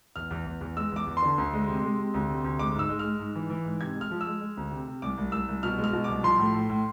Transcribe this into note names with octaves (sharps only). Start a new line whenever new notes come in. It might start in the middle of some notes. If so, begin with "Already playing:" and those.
E2 F6
E2
E2
E2
G#3 E6
E2 D6
E2
C6
D3
D2
G#3
C3
G#3
C3
D2
C3
D2
G#3 D6
G#2 E6
G#3
F6
G#3
G#2
E3
E3
G#2
C3 G#6
G#3 F6
F3
E6
G#3
G#3
D2
C3
C3
C2 D6
C2
C2 E6
C2
B2 F6
G#3
F6
B2
C2 D6
F3 C6
A2
A2
A2